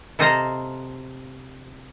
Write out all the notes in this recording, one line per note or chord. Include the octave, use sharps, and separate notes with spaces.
C3 A4 C5 D#5 F5 A#5